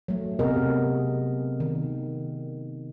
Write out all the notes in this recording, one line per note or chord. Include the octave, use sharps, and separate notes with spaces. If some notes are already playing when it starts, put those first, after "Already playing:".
F#3 A3
C3 B3 G#4 A#4 D#5
D#3